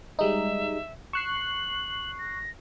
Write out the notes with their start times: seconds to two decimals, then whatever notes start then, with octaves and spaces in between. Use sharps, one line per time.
0.19 G3 G#3 D#4 E5
1.13 C#6 F#6 C7 E7
1.28 F#7
2.19 A#6